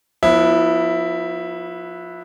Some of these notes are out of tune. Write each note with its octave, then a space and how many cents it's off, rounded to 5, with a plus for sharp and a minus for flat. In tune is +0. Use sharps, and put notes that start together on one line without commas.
F3 +25 B3 -20 E4 -5